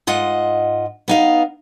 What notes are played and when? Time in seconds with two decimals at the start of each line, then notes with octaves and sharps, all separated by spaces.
0.07 G#2 F4 D#5 F#5
1.08 B3 D#4 F5